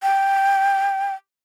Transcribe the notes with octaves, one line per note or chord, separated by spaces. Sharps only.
G5